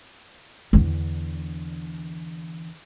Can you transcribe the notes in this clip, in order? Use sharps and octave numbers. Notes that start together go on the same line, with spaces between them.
E2 D3